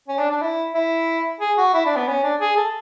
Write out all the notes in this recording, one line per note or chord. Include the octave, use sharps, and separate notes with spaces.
C#4
D4
D4
E4
E4
G#4
F#4
E4
D4
B3
C#4
D4
G#4
A4